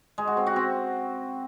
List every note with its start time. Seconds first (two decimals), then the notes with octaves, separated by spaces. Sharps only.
0.18 G#3
0.27 F#4
0.37 C4
0.47 F#4
0.56 C4